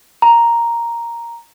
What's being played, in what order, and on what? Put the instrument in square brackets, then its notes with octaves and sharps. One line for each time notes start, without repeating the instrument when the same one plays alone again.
[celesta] A#5